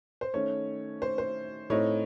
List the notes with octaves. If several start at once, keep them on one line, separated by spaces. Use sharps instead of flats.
C5
D#3 A3 C#4 C#5
C5
C5
A2 A3 C4 D#4 C#5